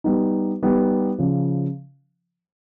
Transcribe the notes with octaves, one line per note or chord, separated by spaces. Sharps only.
G3 B3 D#4
G3 B3 D#4
C#3 F3